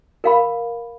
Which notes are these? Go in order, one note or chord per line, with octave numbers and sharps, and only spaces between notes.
A#4 F5 B5